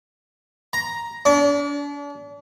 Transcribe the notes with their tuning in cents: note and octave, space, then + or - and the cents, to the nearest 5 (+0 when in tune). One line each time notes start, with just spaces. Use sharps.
A#5 +5
D4 -40